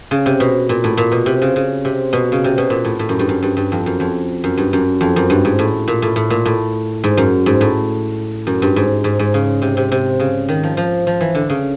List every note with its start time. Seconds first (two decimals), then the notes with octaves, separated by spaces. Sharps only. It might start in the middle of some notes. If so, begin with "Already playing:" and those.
0.11 C#3
0.26 C3
0.40 B2
0.69 A#2
0.84 A2
0.97 A#2
1.12 B2
1.26 C3
1.42 C#3
1.56 C#3
1.85 C3
2.13 B2
2.32 C#3
2.44 C3
2.58 B2
2.70 A#2
2.85 A2
2.99 A2
3.09 F#2
3.19 G2
3.29 F#2
3.43 G2
3.57 G2
3.72 F2
3.86 F#2
4.00 F2
4.44 F#2
4.58 G2
4.73 F#2
5.01 F2
5.16 F#2
5.30 G2
5.45 G#2
5.59 A2
5.88 A#2
6.02 A2
6.16 A2
6.30 A#2
6.46 A2
7.04 G#2
7.17 F#2
7.46 G#2
7.61 A2
8.47 F#2
8.62 G2
8.76 G#2
9.04 G#2
9.19 G#2
9.34 C#3
9.62 C3
9.77 C3
9.92 C3
10.20 C#3
10.49 D#3
10.63 F3
10.77 F3
11.07 F3
11.21 E3
11.35 D3
11.50 C#3